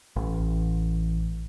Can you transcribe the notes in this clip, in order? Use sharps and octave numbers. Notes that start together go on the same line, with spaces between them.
A1